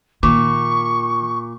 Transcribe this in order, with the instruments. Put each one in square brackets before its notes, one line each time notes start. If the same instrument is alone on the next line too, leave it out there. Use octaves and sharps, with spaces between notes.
[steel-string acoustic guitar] A#2 [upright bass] D#3 [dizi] C#6 [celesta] D6